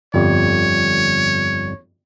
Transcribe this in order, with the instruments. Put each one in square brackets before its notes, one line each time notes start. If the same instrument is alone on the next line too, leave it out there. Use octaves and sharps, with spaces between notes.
[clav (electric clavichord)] G1 F2 G3 [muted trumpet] C#5